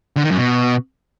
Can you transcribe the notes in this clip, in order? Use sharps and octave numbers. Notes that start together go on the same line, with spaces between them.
D3
D#3
F#2
B2